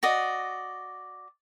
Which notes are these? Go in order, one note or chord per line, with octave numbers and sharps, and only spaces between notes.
F#4 D5 D#5